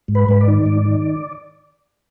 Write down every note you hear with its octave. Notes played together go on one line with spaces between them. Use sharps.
G#2
B4
G#2 B4
D5
D#3
G#2
D#3